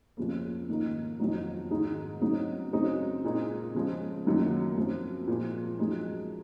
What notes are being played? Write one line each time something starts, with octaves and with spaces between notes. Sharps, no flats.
F2 C#3 F3 A#3
G#2 D#3 A#3 D#4
F2 D#3 F#3 C4 D#4
G#2 D#3 G#3 D#4
C#3 F#3 C4 D#4
F#2 C#3 G#3 C4 D#4
A#2 G#3 C4 D#4
C#3 F3 G#3
F#2 D#3 F#3 A#3
F#2 F3 C4
A#2 F3 G#3
F#2 F3 G#3 D#4